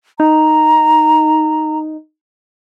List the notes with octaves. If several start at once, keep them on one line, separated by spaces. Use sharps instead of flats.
D#4 A#5